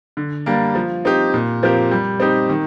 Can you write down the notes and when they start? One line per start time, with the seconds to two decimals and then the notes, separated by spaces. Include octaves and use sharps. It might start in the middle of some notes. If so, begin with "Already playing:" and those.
0.17 D3
0.46 G3 A#3 D4
0.75 F3
1.05 C4 D#4 G4
1.34 A#2
1.63 F3 C4 G4 A#4
1.91 G3
2.20 C4 D#4 G4
2.50 D#3